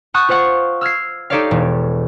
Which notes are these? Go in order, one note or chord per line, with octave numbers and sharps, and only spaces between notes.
F#5 A5 C#6 D#6 F#6 G6
F4 C5 F5 F#5 C#6
E6 F6 G#6 C7
D#4 G4 A4 C#5 D5 F5
E1